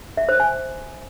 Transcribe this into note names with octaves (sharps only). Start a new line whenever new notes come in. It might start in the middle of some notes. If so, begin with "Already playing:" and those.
E5
C5
G#5